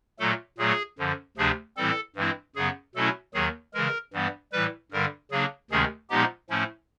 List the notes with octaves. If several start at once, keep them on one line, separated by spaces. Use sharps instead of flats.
A#2 F#3 A3 A4
A#2 F#3 A3 G#4
F#2 D3 F3
D2 C3 F3 A3 D4 G#4
A2 E3 G3 C4 A4
G2 E3 G#3 C4 E4
F#2 C#3 F#3 B3 G#4
B2 F#3 A3 C#4 E4 A4
D#2 D#3 F#3 G#4
C#3 E3 G#3 A#4
G2 E3 G3 B3
A2 E3 G3 B4
G2 D3 G3 A#4
C#3 F#3 A#3 D4 G#4
D2 C3 D#3 G#3 C#4 G#4
A#2 F3 G#3 B3 D#4 G4
A2 F3 A3 C#4 E4